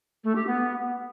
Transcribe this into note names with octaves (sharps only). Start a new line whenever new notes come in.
A3
G4
B3